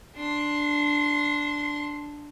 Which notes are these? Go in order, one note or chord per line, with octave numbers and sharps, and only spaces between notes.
D4 C6